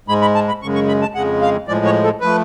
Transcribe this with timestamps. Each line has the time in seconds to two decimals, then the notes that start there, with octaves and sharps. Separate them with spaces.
0.08 G#2 G#3 B5
0.21 B5
0.35 A5
0.48 B5
0.62 F#2 C#3 G#3 C#6
0.75 C#6
0.88 B5
1.02 A5
1.15 F2 C#3 G#3 F#5
1.42 F5
1.67 A2 F3 G#3 D5
1.85 C#5
2.04 A4
2.21 F3 A3 B4